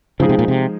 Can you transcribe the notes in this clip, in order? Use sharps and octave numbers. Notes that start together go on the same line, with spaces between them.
C#3 F3 G#3 D#4 G#4
C3
A#2
C3